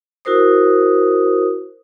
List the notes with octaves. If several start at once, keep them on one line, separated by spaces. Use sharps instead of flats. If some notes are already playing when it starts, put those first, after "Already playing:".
E4 F#4 A#4 C5 D#6